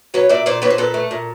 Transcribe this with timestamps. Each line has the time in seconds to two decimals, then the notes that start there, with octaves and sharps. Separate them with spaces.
0.14 F#3 B4 C#5
0.29 A#2 D5 E5
0.46 A#2 C5 D5
0.62 A#2 B4 C#5
0.71 C5
0.78 A#2 A4 B4
0.94 A3
1.11 A#2